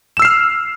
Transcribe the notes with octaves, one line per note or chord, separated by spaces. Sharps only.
E6 F6 C7 E7